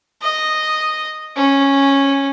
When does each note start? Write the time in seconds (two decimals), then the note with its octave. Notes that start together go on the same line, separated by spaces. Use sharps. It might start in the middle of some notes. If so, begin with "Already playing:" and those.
0.22 D#5
1.37 C#4